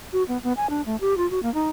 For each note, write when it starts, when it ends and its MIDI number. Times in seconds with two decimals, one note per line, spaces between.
0.13 0.23 66
0.28 0.38 59
0.44 0.53 59
0.57 0.69 80
0.70 0.82 62
0.86 0.96 57
1.01 1.17 67
1.17 1.29 65
1.31 1.42 66
1.43 1.52 58
1.54 1.69 63